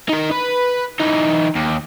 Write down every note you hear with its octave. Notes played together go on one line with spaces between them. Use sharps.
D#4 A#4
B4
E3 D#4
D#2